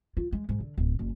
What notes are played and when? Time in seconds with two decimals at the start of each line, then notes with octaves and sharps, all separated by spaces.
0.17 F4
0.32 G#3
0.49 G#2
0.60 D3
0.78 D1
0.99 F#1